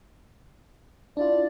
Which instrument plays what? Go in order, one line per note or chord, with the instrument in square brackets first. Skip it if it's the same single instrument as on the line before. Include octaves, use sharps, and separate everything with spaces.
[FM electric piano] D4 E4 F4 [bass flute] D5